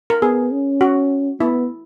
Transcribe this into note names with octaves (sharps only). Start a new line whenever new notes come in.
A#4
B3 G#4
C#4
F#4
B3 E4